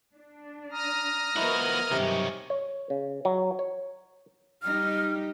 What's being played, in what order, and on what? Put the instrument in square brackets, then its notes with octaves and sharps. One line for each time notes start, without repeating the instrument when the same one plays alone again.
[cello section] D4
[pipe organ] A#5 D#6 F6
[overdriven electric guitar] F3 F#4 [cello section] B3 A#4 B4 [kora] E4 D#5
[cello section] G2 F#3 [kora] C3 [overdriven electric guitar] D#3 C#4
[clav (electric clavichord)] C#5
C#3
F#3
C#5
[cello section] G3 D#4 G4 [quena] F6